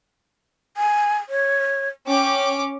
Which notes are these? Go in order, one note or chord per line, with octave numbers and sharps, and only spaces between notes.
G#5
C#5
C#4 G5 D6